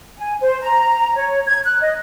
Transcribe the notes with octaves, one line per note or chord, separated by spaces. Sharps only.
G#5
C5
A#5
C#5
G#6
F#6
D#5